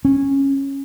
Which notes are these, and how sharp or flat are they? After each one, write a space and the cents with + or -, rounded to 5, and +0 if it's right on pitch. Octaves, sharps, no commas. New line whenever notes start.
C#4 -10